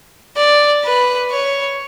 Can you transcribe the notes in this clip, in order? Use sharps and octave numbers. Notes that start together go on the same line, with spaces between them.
D5
B4
C#5